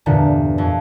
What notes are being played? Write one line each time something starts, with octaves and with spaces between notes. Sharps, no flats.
E2 G2 A#2 D3
F2